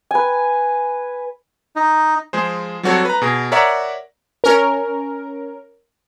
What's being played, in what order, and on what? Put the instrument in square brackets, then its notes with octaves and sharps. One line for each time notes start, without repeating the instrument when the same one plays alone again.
[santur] B4 G#5
[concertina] D#4
[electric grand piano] F3 G#3 G#4 C5
F#3 G3 C4 F#4 A4 C#5
B4 A#5
B2 G#4 A#6
A#4 C#5 D5 E5 F#5 A#5
[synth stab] C#4 A#4